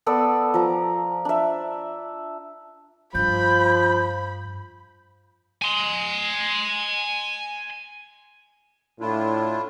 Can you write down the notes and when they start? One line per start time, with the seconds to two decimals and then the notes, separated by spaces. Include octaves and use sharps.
0.06 B3 A4 D5 E6
0.54 F3 A#5
1.25 D4 E5
3.15 G2 F3 B5 G6
5.62 G#5 C6
9.00 A2 D4 E4 F4